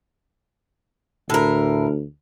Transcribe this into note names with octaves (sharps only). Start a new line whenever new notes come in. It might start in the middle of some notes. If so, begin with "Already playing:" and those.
D2 A2 A#4